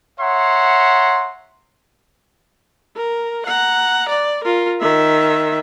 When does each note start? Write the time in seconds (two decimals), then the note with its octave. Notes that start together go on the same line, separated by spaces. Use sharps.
0.20 C#5 E5 F#5 A#5 C6
2.96 A#4
3.46 F#5 A#5
4.09 D5
4.44 F4 A#4
4.81 D#3 E5